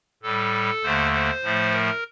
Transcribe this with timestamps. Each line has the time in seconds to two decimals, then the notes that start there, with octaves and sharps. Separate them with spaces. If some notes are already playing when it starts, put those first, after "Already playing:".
0.23 A2 G3 A4
0.83 D#2 D3 A3 C5
1.13 C5
1.43 A2 F3 A3
1.72 A#4